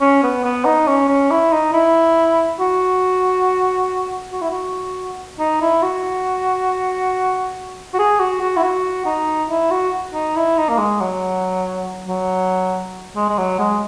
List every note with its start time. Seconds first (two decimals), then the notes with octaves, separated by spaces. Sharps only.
0.01 C#4
0.23 B3
0.44 B3
0.65 D#4
0.88 C#4
1.09 C#4
1.31 E4
1.52 D#4
1.73 E4
2.60 F#4
4.32 F#4
4.41 E4
4.50 F#4
5.39 D#4
5.62 E4
5.82 F#4
7.94 F#4
7.99 G#4
8.20 F#4
8.41 F#4
8.57 E4
8.63 F#4
9.06 D#4
9.50 E4
9.71 F#4
10.14 D#4
10.36 E4
10.58 D#4
10.69 A#3
10.78 G#3
11.01 F#3
12.08 F#3
13.16 G#3
13.29 G#3
13.38 F#3
13.59 G#3